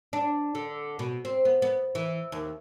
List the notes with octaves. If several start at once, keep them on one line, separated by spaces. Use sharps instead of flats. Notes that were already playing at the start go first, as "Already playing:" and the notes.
D4
D3
B2
C4
B3
B3
E3
D#2